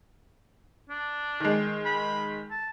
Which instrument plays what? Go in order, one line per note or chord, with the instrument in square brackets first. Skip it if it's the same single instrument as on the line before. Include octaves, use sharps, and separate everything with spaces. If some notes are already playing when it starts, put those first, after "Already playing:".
[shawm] D4
[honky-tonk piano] D#3 G#3
[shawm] B5
A5